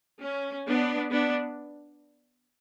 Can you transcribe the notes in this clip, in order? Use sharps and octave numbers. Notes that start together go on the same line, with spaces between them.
C#4
B3 D4
B3 D4